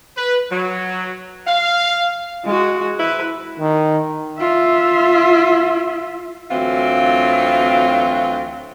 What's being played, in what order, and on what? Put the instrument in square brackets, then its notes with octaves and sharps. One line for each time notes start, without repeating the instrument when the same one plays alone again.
[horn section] B4
F#3
F5
[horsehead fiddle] G#3 F#4
[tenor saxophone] E4 [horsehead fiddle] B4
[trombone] D#3
[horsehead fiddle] F4 E5
[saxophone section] D2 E3 F#3 C4 F4